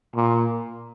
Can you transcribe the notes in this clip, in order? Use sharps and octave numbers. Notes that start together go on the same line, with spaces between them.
A#2